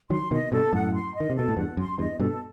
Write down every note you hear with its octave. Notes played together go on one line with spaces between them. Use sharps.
D#3 F#3 C6
B2 D#3 D#5
G2 B2 A4
F#2 A2 F#5
C6
D#5
D#3
C3
B2 A4
A2
E2 G2 F#5
F#2 C6
E2 G2 D#5
G2 B2 A4